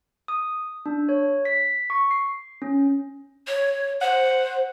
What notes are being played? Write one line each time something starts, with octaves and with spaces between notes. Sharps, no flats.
D#6
D4
C#5
B6
C#6
C7
C#4
C#5
C5 F#5